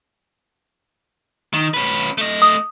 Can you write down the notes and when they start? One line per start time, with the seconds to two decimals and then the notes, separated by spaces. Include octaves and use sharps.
1.54 D#3
1.74 C#4 B4
2.18 A3 D#5
2.42 D#6